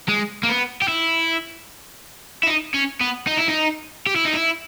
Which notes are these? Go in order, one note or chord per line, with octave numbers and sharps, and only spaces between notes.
G#3
A#3
B3
G4
E4
E4
D#4
C#4
B3
D#4
E4
D#4
G4
E4
D#4
E4